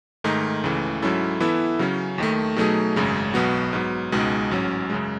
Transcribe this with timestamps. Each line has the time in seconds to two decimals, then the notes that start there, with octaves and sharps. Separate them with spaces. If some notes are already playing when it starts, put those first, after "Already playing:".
0.24 G#2 D#3 A3 D#4 G#4
0.64 C#2 C#3 E3 A3
1.02 G#2 F#3 C#4 E4 A4
1.40 E3 B3 E4 A4 E5
1.79 C#3 F#3 C#4
2.18 D#2 D#3 A3
2.56 B2 F#3 A3 D#4 G#4
2.96 G#1 F#2 C#3 G#3
3.34 B1 B2 F#3 B3 F#4
3.73 G#2 F#3 B3
4.12 C#2 B2 G#3 D#4 G#4
4.51 A1 G#2 F#3 C#4
4.90 F#2 C#3 G#3